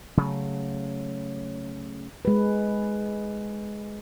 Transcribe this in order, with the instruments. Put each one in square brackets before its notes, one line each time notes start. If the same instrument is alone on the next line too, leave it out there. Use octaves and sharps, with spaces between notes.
[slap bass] C#3 F#3 A3
[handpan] G#3 B4